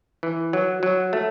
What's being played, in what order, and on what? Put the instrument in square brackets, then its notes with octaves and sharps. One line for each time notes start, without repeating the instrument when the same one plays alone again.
[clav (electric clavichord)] E3
F#3
F#3
A3